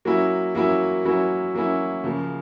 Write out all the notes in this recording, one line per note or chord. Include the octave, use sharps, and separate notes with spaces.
F#3 A#3 C#4 E4
F#3 A#3 C#4 E4
F#3 A#3 C#4 E4
F#3 A#3 C#4 E4
C#3 F3 A#3